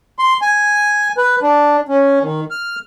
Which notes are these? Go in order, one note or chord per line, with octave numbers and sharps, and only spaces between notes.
C6
G#5
B4
D4
C#4
D#3
F6